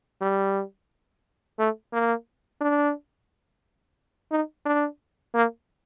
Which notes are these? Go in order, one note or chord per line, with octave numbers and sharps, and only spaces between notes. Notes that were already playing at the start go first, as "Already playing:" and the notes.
G3
A3
A#3
D4
D#4
D4
A#3